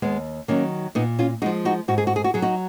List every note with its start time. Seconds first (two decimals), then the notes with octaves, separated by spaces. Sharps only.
0.02 D#2 G#3 B3
0.48 D#3 F#3 A#3 C#4
0.95 A#2 B3 D#4
1.19 C#4 F4
1.42 G#3 D#4 F#4
1.46 F3
1.65 D#4 F#4
1.88 G#2 F#4
1.98 G#4
2.07 F#4
2.16 G#4
2.24 F#4
2.34 F#3 G#4
2.42 D#4 F#4